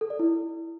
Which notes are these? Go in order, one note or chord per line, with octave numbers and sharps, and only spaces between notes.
A4
D5
E4